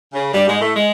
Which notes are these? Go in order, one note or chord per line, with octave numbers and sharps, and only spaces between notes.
C#3
G2 G3
G#2 G#3
A2 A3
G#3